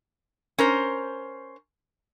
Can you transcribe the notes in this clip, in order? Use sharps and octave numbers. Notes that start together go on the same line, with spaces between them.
C#4 A#4 C5